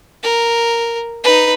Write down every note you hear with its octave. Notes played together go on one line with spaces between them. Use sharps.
A#4
D#4 B4